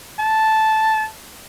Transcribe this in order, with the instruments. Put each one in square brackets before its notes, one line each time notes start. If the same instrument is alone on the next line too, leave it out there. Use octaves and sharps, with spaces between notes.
[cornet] A5